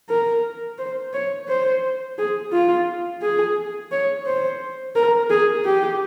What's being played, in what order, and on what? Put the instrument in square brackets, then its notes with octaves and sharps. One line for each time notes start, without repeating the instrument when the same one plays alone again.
[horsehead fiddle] A#4
C5
C#5
C5
G#4
F4
G#4
C#5
C5
A#4
G#4
G4